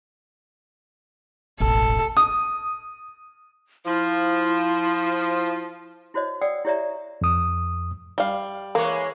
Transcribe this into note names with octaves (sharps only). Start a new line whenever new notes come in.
E1 A1 A4
D#6
F3 E4
E4 F#4 C5 C#5 D#5
D5 F#5 G5 D#6 E6
E4 G4 C#5 D5 E5 A#5
F2 D#6
G3 F5
E3 G#3 A#3 C#5